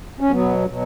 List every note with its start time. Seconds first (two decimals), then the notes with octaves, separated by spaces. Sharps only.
0.21 C#4
0.31 B2 F#3 B3
0.68 B2 F#3